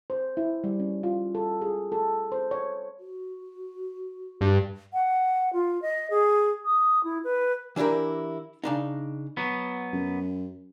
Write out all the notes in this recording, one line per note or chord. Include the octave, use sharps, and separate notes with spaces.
C5
E4
G3
C#4
F4
A4
G#4
A4
C5
C#5
F#4
G2
F#5
F4
D#5
G#4
D#6
E4
B4
E3 D4 E4 G4 A#4
C#3 D4 D#4
F#3 B3
F#2